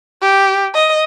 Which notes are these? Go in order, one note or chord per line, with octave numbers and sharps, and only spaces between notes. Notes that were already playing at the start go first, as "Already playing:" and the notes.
G4
D#5